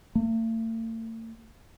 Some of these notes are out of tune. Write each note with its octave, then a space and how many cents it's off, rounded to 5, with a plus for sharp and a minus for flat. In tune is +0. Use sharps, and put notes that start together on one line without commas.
A3 +45